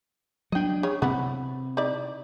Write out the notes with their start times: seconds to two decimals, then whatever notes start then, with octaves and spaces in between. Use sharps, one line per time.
0.52 F#3 D4 D#5 G5
0.83 C#3 G#4 C#5
1.02 C3 B3 E4 F#5
1.77 D#4 E4 D5